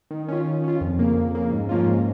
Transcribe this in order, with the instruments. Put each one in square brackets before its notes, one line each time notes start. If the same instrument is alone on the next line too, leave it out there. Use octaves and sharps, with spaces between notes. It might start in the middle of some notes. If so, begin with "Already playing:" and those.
[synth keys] D#3
C#4 F4
D#3
C#4 F4
F2
C#3 A#3
F2
C#3 A#3
G#2
F3 A#3 C#4 F4
G#2